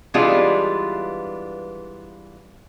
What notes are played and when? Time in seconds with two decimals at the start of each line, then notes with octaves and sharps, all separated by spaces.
0.14 E3 G3 G#3 B3 D4 F4